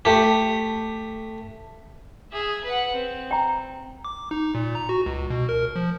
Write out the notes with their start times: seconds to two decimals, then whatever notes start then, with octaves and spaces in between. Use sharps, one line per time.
0.05 A3 G4
2.32 G#4 E5
2.64 B4 F#5
2.94 C4
3.31 G5 A#5
4.05 D6
4.31 D#4
4.55 A#2
4.75 A#5
4.89 F#4
5.06 C#2
5.30 B2
5.49 A#4
5.76 F3